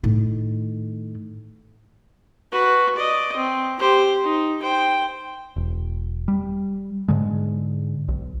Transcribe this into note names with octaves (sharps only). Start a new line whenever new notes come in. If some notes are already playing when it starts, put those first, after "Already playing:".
A2 D#3
F#4 B4
D5 D#5
C4
G4 C5
D#4
C5 G5
E1
G3
G#2 D3 G#3
B1